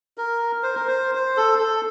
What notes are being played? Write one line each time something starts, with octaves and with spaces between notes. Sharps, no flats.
A#4
C5
A#4
C5
C5
A4
A4